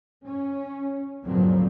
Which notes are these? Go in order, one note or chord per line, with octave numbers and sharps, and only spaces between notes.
C#4
D2 G2 A#2 F3 F#3 C4